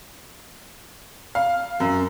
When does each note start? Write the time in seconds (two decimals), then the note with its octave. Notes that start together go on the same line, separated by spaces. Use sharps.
1.35 F5
1.80 F#2